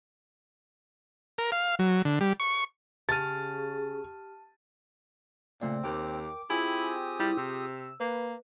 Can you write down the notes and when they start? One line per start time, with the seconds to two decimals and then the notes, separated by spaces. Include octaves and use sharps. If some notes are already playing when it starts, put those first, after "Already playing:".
1.38 A#4
1.52 F5
1.79 F#3
2.05 D3
2.21 G3
2.40 C#6
3.09 C#3 G4 A5 F6 A6 D#7
5.62 A#2 C#3 A3 C4 D5
5.84 D#2 A#4 G5 D6
6.50 C4 E4 F4 G4 G#4 G#5 D#6
7.20 G3 E4
7.38 C3 E6
8.00 A#3 B4